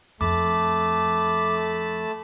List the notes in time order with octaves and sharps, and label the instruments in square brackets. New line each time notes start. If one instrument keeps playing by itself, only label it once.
[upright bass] F2 [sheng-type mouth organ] A3 A5 B5 [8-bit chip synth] D6